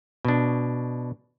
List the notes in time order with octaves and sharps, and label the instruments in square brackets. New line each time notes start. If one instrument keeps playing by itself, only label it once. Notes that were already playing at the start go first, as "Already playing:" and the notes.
[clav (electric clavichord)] B2 D4